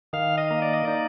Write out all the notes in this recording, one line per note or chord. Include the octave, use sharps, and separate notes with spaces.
D#3 F5
D#5
A#3
D5
D#5
D#4 D5